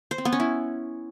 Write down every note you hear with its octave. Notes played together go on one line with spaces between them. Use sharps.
C5
C4
B3
C#4
E4